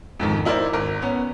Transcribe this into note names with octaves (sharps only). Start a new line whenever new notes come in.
F2 G#2 D#3
D#4 E4 A#4 C5 D5
G#1 A#4
B3 C#4